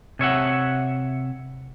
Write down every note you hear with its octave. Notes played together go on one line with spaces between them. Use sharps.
C3 C#5 E5 F#5